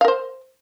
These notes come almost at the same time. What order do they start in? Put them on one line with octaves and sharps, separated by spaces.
F5 A#4 C5